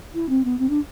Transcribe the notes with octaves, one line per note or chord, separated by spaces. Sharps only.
E4
C4
B3
C4
D4